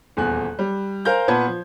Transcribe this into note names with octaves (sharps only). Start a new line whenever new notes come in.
D#1 E2 G#5 F#6
G3
A#4 C5 F5 G#5 A#5 G6
A#2 B3 B4 A5 G#6
F3